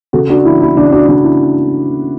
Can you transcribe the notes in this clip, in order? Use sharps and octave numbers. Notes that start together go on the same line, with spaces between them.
C#3 F#4 A4
D4 F#4
E3 E4
E4
C#3 D4
D4 F#4
C#3 D4
E4